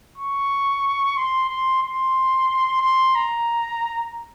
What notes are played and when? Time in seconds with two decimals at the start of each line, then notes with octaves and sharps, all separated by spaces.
0.18 C#6
1.17 C6
1.49 C6
1.83 C6
2.82 C6
3.15 A#5